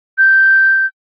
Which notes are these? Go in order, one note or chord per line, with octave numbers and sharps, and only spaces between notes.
G6